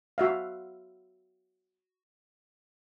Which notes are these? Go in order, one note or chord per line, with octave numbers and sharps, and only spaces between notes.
F#4 E5 F5